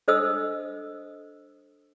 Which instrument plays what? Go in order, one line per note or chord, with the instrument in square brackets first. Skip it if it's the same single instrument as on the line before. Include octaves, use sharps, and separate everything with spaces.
[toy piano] D4 A4 C5 D#5 D#6 E6